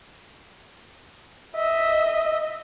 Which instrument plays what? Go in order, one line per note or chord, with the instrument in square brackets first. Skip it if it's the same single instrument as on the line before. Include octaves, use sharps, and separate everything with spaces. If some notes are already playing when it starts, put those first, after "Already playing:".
[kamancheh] D#5 E5